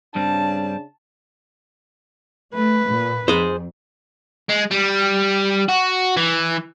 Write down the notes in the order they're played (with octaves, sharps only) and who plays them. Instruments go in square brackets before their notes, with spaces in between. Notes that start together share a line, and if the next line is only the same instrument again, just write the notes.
[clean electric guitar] G2 G3 C4 [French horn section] C#3 D4 [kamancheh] A5
[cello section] A3 [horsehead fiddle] B4
[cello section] A#2
[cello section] F2 [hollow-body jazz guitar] G#4 C5
[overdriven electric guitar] G#3
G3
F#4
E3